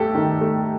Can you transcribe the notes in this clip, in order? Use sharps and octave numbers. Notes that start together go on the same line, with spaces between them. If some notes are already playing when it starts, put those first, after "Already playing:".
Already playing: D#2 A3 G4 A4
D#3
A3